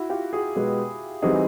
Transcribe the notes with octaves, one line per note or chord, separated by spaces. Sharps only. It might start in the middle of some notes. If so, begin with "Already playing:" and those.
Already playing: E4 F#4
F4 G4
F#4 G#4
B2 G#3 B3
E3 G3 C4 D#4 F#4 G#4